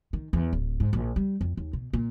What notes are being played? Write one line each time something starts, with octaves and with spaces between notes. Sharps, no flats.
D#3
E2
D1
G#2
A#1
G3
F2
D#2
B2
A#2